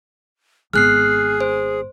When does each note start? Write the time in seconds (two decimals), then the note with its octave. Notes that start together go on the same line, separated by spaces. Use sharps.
0.73 G#1 B3 G#4 F6 F#6 C7
1.41 C5